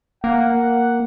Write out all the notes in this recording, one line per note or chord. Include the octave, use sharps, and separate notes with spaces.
A#3 F#5